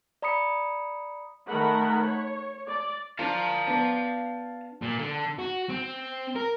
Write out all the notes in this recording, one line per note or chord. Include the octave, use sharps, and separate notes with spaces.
D5 A#5 B5 D#6 C#7
D#3 A3 A#4 F#5 B5
C#5
D5
D4 F4 A#4 F5 A5
B3 D4
A#2
D3
F#4
C4
A#4